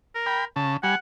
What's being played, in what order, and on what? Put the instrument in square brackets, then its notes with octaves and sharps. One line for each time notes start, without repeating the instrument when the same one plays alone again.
[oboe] A#4
[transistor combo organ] G5 B5
[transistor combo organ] C#3 [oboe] A5
[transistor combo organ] G3 G#5 [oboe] F#5